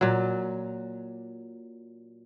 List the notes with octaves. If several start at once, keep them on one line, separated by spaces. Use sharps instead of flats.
A#2 F#3